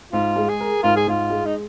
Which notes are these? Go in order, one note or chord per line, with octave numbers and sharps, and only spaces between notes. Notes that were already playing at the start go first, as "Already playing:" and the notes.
G#2 F4
G#3
G#4
A#4
G#2 F4
G#4
G#2 F4
G#3
D#4